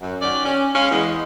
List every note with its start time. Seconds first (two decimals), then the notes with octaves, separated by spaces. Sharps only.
0.01 F#2
0.21 D#3 C#4 F#4 D5
0.45 C#4
0.75 G#3 C#4 F5
0.90 E2 G#3